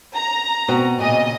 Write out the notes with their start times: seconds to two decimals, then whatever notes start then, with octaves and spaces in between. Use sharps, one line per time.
0.15 A#5
0.68 B2 C4 F#4
1.00 A#2 C#3 D#5